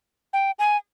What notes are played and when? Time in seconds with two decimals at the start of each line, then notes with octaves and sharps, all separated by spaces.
0.33 G5
0.59 G#5